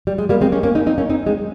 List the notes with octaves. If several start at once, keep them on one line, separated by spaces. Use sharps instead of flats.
G3
G#3
G3 A#3
G#3 C4
A#3 C#4
A#3 C#4
C4 D#4
C4 D#4
A#3 C#4
C4 D#4
G#3 C4